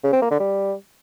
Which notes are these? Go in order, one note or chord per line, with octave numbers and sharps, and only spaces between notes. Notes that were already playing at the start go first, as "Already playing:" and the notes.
C#3
C4
A#3
D3
G3